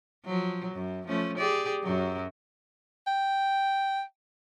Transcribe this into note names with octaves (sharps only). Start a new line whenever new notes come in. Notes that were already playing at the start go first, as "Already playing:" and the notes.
F3 F#3
F#2
F3 A3 C#4
G4 G#4 D5
F#2 F#3
G5